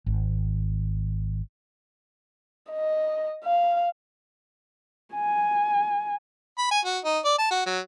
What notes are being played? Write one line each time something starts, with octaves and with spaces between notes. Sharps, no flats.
G#1
D#5
F5
G#5
B5
G#5
F#4
D#4
D5
A5
F#4
F#3